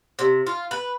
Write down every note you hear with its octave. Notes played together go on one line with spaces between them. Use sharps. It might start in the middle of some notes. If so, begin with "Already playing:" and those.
C3
F4
B4